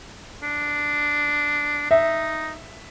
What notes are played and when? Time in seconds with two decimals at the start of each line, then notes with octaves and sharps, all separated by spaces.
0.43 D4
1.91 D#4 E5